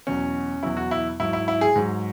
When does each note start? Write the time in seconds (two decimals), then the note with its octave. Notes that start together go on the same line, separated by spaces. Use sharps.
0.07 E2 B2 F#3 C#4
0.63 E2 B2 F#3 E4
0.77 F#4
0.91 E4
1.20 G#2 F#3 E4
1.33 E4
1.48 E4
1.61 G#4
1.75 G#2 F#3